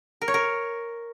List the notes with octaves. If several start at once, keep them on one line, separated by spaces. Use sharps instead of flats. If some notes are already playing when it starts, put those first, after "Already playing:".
A#4
C#5
A#4